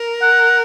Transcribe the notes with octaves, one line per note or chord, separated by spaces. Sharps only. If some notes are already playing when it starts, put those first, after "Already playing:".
Already playing: A#4
F#5